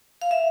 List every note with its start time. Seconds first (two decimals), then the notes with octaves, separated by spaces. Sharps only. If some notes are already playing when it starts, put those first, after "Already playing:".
0.22 F5
0.31 E5